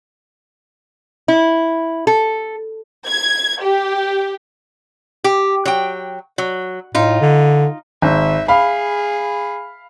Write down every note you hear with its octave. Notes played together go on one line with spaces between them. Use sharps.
E4
A4
G#6
G4
G4
F#3 G5
F#3
A2 D#4 F4
D3
G#1 E5
G#4 F5 B5